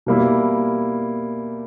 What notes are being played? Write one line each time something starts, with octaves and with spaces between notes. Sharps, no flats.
B2 G3 A#3 E4